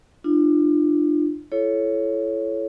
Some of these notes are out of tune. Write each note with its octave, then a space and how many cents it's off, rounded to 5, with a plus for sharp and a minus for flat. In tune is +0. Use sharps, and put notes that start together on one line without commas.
D4 +35 F4 -25
E4 +30 A4 -25 C#5 +0